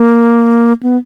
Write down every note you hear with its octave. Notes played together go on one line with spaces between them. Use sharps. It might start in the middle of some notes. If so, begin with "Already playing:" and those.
Already playing: A#3
B3